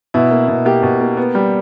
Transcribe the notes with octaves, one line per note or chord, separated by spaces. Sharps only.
B2 E4
A#3
B2
A#3 G4
B2
A#3
B3
G3